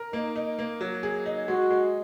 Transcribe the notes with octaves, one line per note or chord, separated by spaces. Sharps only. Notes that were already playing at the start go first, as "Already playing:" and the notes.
Already playing: A#4
A#3 D#4
D#4
A#3
F#3
G#4
D#4
G#3 F#4
G#3